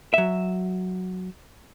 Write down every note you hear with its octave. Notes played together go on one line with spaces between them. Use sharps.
F#3 E5